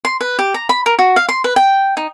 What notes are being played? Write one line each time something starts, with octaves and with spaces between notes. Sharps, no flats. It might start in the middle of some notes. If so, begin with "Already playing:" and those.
C6
B4
G4
A#5
B5
A#4
F#4
F5
C6
B4
G5
D#4